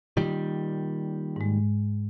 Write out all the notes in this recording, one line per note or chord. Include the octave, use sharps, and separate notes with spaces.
A#2 D#3 G3
G#2 G#3